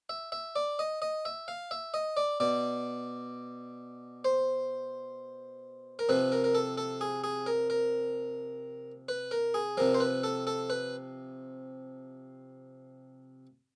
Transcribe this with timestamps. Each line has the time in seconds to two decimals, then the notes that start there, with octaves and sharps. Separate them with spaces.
0.09 E5
0.32 E5
0.56 D5
0.79 D#5
1.02 D#5
1.25 E5
1.48 F5
1.71 E5
1.94 D#5
2.17 D5
2.40 B2 D5
4.25 C5
5.99 A#4
6.09 C3 F3 B4
6.32 A#4
6.44 A#4
6.55 A4
6.77 A4
7.01 G#4
7.24 G#4
7.46 A#4
7.70 A#4
9.09 B4
9.31 A#4
9.54 G#4
9.77 C3 F3 A#4
9.94 C5
10.00 B4
10.23 A4
10.47 A4
10.70 B4